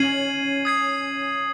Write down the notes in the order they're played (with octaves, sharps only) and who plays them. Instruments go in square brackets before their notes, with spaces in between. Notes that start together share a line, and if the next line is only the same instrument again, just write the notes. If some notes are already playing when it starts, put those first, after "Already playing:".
Already playing: [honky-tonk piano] C#4 [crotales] G#6 C7 D#7 F#7
[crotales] D#6 G#6 C7